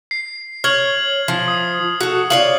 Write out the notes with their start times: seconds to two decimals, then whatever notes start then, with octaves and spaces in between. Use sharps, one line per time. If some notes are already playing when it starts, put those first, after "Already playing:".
0.11 C7
0.64 C#5 F6 G#6 F#7
1.28 F3
1.48 D#6
2.01 F#4 A4
2.30 F4 C#5 D5 F#7